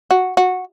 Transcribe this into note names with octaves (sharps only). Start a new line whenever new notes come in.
F#4
F#4